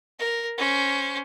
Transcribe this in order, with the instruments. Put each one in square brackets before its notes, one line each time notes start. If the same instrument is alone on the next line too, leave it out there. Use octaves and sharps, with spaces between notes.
[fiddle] A#4
C#4 C5